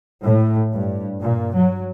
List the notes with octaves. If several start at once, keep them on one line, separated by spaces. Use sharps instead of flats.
A2
G2
A#2
F#3